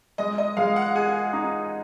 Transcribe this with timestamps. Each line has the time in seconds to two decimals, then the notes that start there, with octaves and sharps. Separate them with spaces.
0.18 G#3 D#5
0.38 D#5
0.57 G#3 F5
0.76 F#5
0.95 G#4 G#5
1.33 D#4